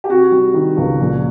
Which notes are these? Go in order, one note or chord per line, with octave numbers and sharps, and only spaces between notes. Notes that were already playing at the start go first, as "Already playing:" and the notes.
G4
C3 F#4
G3
D#3
C#2
A#1